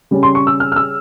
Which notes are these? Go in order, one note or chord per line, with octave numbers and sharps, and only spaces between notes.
C#3 G3 C#4
C6
C#6
E6
F6
F6
E6